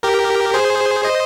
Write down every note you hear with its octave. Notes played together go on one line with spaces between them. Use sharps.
G4 A#4
G#4 C5
C5 D#5